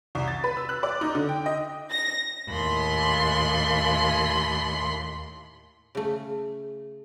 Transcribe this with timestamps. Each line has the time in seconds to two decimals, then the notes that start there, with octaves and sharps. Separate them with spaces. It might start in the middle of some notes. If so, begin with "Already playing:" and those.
0.15 C2
0.28 A6
0.44 B4
0.57 E6
0.69 F#6
0.83 D5
1.01 D#4
1.15 D3
1.29 G5
1.46 D#5
1.90 A#6
2.48 D#2 A2 B5 C6
5.95 C#3 A3